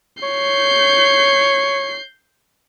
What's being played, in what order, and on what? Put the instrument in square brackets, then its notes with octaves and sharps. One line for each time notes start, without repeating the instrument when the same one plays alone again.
[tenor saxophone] C#5 [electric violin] G6 C7